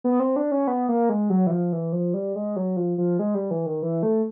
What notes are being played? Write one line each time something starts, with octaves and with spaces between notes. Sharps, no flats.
B3
C4
D4
C#4
B3
A#3
G#3
F#3
E3
F3
E3
F3
G3
G#3
F#3
F3
F3
G#3
G3
E3
D#3
E3
A3